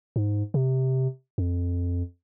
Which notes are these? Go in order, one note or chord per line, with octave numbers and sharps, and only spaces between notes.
G#2
C3
F2